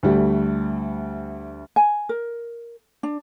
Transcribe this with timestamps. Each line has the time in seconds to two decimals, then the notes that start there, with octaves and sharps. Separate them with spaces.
0.03 D2 G3 A3
1.76 G#5
2.09 A#4
3.03 D4